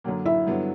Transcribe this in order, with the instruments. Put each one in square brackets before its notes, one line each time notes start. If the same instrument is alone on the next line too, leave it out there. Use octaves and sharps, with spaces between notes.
[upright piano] F#2 D3 F#3 A#3
[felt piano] E4 E5
[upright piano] G2 D3 F#3 B3